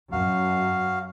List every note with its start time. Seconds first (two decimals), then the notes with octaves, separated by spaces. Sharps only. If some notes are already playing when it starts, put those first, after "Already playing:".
0.12 F#2 F#4 F5